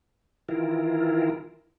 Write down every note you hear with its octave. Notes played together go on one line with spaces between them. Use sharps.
D#3 E3 E4 F4 A#4